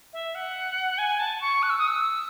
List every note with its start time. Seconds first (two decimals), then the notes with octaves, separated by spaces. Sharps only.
0.13 E5
0.34 F#5
0.98 G#5
1.19 A5
1.40 C#6
1.62 F#6
1.69 E6
1.78 D#6
1.87 E6